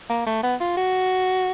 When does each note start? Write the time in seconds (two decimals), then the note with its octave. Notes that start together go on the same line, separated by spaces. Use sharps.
0.10 A#3
0.26 A3
0.43 B3
0.60 F4
0.77 F#4